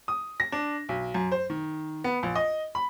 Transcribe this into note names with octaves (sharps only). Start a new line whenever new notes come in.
D#6
A#6
D4
B1
F#2
C5
D#3
B3
A#1
D#5
B5